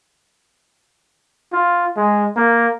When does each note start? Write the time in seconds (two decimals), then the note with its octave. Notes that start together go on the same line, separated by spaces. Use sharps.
1.53 F4
1.97 G#3
2.37 A#3